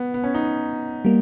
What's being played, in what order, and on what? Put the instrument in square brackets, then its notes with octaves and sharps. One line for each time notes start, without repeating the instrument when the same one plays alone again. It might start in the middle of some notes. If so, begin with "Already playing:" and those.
Already playing: [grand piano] B3
B3
C#4
D#4
[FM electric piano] G3 A#3